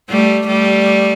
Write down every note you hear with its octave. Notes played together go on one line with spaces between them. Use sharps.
G3 A3
G3 A3